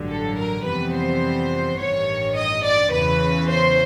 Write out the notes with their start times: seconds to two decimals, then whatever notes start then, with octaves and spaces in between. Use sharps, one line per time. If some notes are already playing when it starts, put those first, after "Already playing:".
Already playing: A1 G2 D3 F#3
0.09 A4
0.37 A#4
0.65 F2 C3 E3 G3 B3 B4
0.93 C5
1.78 A1 G2 D#3 C#5
2.36 D#5
2.64 D5
2.92 E2 C#3 E3 B4
3.49 C5